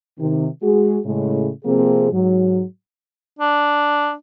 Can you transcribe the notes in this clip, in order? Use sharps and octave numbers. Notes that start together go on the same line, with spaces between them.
C3 D#3
G#3 F#4 G#4
A2 C#3 G#3
C3 F3 A#3 C4 G#4
G#2 F#3
D4